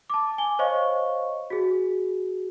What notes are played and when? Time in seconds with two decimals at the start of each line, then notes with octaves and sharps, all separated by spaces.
0.10 A5 D6
0.38 G#5 G7
0.59 C5 C#5 D#5 F5 C#6
1.50 F#4 G#4